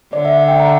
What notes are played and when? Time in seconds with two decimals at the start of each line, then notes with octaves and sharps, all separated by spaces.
0.13 D3 D5
0.25 E5
0.36 E5
0.48 G5
0.60 A#5